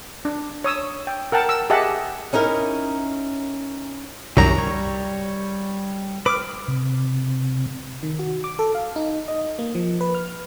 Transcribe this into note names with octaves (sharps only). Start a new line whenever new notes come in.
D4
C#5 D#6 E6
G5
A#4 F#5 G5 A5
E6
G4 G#4 D#5 E5 F#5 A5
C#4 D#4 E4 A#4
C2 F#2 D#3 F#3 A#5
G3 C#5
B4 D6 D#6 F6
C3
D#3
F#4
D6
A4
F5
D#4
D#5
A#3
F3
B4
F6